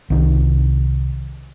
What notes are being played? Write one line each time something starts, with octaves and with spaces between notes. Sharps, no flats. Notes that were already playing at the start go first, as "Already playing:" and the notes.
C2 D#3